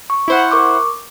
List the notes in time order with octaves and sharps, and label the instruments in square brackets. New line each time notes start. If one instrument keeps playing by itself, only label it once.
[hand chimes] C#6
[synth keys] E4 C5 F#5
[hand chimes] A#4 C#6 D6